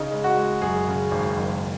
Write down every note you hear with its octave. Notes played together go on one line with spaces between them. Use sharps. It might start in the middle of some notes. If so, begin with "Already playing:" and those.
Already playing: C#3 D#4
G#3
F#4
G#3
F#2 G#4
C#3
G#1
F#1